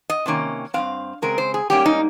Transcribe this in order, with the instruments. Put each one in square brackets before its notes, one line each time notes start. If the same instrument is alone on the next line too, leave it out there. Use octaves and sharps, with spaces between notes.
[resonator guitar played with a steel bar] D#5
C3 D#3 A#3 C#4
G2 F3 C4 F5
C#3 G#3 C4 A#4
C5
G#4
G#2 G3 A#3 C#4 G4
D#4